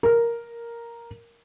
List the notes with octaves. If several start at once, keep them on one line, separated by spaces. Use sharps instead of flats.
A#4